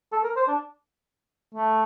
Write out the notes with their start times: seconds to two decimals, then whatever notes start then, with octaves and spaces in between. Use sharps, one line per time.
0.12 A4
0.24 A#4
0.36 C5
0.48 D4
1.55 A3